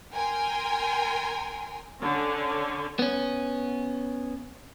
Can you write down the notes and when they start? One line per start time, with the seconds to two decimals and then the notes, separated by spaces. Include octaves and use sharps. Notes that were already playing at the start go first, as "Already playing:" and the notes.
0.14 A#4 G5 G#5 C6
2.00 D3 C#4
2.99 B3 C#4